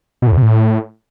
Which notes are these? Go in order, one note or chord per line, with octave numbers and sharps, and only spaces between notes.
B2
A2
E2
C3
A2